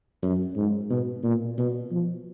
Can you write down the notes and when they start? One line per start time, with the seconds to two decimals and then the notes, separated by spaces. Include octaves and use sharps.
0.22 F#2
0.56 G#2
0.90 B2
1.23 A#2
1.58 B2
1.92 F3